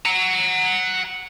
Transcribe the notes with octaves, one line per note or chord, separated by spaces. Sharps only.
F#5 A#5